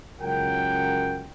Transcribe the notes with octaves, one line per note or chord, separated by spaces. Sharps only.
C#2 F#2 F#3 A#4 F#5 G5